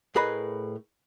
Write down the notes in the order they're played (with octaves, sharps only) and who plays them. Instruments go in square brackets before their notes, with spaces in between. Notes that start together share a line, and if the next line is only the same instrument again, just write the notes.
[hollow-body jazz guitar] A2 G#4 A#4 B4 D#5 B5